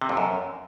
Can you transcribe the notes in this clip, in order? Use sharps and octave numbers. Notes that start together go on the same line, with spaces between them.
C3
F2
F#2